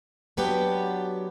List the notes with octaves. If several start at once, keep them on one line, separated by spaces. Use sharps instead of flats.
F#3 B3 D4 G4 B4